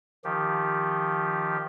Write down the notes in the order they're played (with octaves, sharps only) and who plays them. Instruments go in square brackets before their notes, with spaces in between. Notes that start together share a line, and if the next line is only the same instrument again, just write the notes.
[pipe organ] D#3 F3 G4